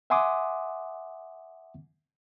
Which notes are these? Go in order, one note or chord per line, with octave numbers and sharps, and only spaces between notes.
E5 F#5 G#5 C6 D6 D#6